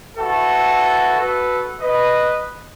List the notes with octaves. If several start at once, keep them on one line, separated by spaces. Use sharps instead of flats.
E4 F#4 A4 B4
F#4 A4 B4
B4 D#5